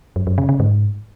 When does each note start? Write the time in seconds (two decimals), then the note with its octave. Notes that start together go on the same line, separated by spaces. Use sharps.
0.16 F#2
0.27 F#2
0.38 C#3
0.49 C#3
0.60 G#2